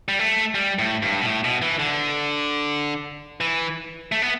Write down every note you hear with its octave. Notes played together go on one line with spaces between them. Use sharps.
G3
A3
G3
A2
G2
B2
A2
B2
E3
D3
E3
A3
B3